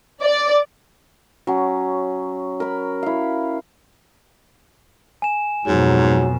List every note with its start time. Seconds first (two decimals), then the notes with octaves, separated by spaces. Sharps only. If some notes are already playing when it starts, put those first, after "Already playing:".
0.22 D5
1.47 F#3 C#4
2.60 A#4 B5
3.03 E4 F5
5.22 G#5 E7
5.67 F2 G#2 B2 F#3